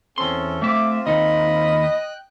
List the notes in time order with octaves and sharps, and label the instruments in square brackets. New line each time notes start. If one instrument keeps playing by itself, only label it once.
[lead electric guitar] E2 C6 [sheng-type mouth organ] C4 C#4 A4
[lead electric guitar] A3 E5 [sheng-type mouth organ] C4 F4 [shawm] D6
[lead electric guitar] D#2 D#4 [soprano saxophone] D#5 [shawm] B5
[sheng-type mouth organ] G5 F#6